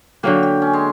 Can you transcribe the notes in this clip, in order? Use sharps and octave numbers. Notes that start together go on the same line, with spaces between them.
D3 F#3 A#3 G4
G4
C#4
G#3